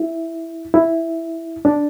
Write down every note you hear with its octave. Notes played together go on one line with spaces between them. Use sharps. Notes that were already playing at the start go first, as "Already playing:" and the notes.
Already playing: E4
E4
D4